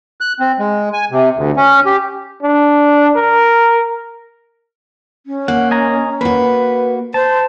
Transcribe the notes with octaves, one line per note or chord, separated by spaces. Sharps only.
F#6
C4
G#3
G#5
C3
D2
C#4
G4
D4
A#4
C#4
A#3 F#5
D#5 G#5 A#5
A#3 F#4 B4
C5 A5